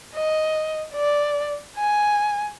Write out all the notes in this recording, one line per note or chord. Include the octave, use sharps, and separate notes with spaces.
D#5
D5
G#5